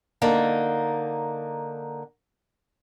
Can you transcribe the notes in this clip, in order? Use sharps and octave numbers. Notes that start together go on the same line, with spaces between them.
D3 A#3 D#4